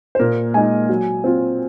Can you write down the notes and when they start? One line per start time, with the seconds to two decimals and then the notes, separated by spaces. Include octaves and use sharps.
0.15 C5
0.19 A#2 A#4
0.54 G#3 D#4 G#5
0.89 F#3
1.24 C4 F4